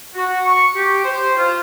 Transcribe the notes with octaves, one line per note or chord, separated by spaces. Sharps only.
F#4
C#6
G4
C5
F4